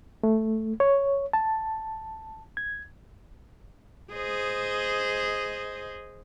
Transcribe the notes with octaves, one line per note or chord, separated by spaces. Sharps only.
A3
C#5
A5
G#6
G#4 C5 D#5